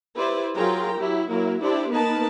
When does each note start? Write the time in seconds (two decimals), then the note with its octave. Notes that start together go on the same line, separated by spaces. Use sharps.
0.16 E4 G4 B4 C5 D5
0.55 F#3 F4 G#4 A#4 G5 A#5
0.96 F#3 E4 G4
1.31 F#3 A#3 E4 A#4
1.62 D4 E4 G4 C5 D5
1.92 A#3 B3 D#4 A#4 B4 A5